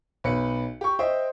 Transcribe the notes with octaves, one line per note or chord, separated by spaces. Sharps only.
B1 B4 C#7
G4 C#6
C5 D#5 E5 G5